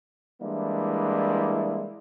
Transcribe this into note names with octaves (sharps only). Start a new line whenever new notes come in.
E3 G3 G#3 A#3 D4 E4